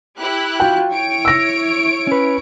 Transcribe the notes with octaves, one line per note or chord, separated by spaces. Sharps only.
E4 G4 F#6
F4 F#4 G5
E4 C#5 D7
E6 A#6
C#4 B4